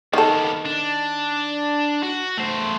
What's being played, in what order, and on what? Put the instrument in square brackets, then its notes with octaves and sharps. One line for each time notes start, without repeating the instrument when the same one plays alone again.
[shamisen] D#3 A4 [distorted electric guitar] A#3 B3
[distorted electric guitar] D4
F#4
A3 C5